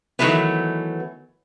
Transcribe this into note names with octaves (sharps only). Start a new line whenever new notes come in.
D#3 E3 F#3 A3 B3